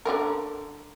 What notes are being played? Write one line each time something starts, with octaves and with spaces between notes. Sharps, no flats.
D3 A3 A#4